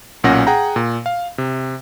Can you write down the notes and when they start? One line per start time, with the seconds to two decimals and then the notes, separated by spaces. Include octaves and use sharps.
0.24 B1 A#2 C#4 F#5 A#6
0.47 G#4 F#5 G5 A#5
0.76 A#2
1.06 F5
1.38 C3